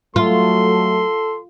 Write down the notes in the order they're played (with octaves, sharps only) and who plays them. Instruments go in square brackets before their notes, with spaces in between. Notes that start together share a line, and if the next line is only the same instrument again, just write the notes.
[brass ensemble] F#3 A3 [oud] F4 [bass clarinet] A4 [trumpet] C6